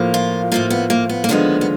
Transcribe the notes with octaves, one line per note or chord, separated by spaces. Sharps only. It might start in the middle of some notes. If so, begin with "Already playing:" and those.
Already playing: A2 F3 A#3
F4
A2 F3 A#3 F4
B3
A#3
B3
A#3
D#2 D3 F3 G#3 B3
B3